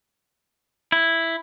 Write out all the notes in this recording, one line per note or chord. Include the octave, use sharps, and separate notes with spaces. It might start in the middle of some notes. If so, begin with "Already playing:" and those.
E4